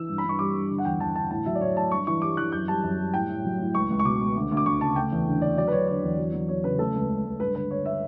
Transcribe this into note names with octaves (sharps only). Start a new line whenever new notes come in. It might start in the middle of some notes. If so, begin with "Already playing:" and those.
Already playing: E3 E6
G2
B5
G2 C#6
G3 D6
G2
D3
F#5
E2 G5
E2 A5
D3 A5
A2 A5
F#3 E5
D5
A2 C#5
A2 A5
G2 C#6
E3 C#6
G3 D6
E3 F#6
F#2 G6
G3 A5
F#2
G3
A2 G5
A2
F#3
A2
C#2 C#6
C#2
C#6
B2 D6
C#2
D2
D2
D6
D2 C#6
C#3 A5
A3 G5
E2
D3
D3 D5
F#3 D5
B4
F#3 C#5
D3 C#5
E2
F#3
F#3
F#3 C#5
C#3 B4
A3 A4
C#2 B4
C#2
C#2
G2 B4
D3 B4
D3 C#5
E5